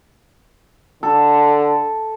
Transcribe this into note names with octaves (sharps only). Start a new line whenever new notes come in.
D3 A4